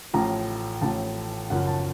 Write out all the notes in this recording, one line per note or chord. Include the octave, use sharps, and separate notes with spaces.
A1 A2 F3 A#5
A1 A2 F3 A5
F#1 F#2 F3 F#5
A5